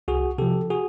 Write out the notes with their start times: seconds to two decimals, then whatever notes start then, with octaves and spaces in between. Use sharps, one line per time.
0.08 C2 F#4 G#4
0.38 C3 F3 G4 A4
0.70 F#4 G#4